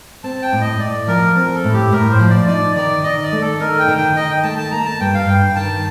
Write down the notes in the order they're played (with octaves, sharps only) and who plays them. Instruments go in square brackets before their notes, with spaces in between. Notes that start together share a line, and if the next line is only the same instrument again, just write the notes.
[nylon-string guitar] C4 [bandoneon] A5
[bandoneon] G5
[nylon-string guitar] A2
[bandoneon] D#5
[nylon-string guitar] A2 [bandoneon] D5
[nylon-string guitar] F3 [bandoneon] A#4
[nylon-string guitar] C4 [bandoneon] A#4
[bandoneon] A4
[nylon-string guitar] A2
[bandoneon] G4
[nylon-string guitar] A2 [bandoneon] A#4
[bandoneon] C5
[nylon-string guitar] F3
[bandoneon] D5
[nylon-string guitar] D#4 [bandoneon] D5
[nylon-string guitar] D#3 [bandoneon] D5
[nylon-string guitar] D#3 [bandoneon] D#5
[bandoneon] D5
[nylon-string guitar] A3
[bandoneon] A4
[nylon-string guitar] D#4 [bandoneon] A#4
[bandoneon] G5
[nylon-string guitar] D#3
[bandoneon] G5
[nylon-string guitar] D#3 [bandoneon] D#5
[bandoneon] G5
[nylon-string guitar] A3 [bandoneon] A5
[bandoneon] A5
[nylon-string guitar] A#3 [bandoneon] A#5
[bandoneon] A5
[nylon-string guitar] G2 [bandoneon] G5
[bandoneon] F5
[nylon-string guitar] G2 [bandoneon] G5
[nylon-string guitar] D#3 [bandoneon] A5